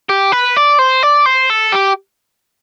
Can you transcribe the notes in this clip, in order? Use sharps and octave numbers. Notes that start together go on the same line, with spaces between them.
G4
B4
D5
C5
D5
C5
A4
G4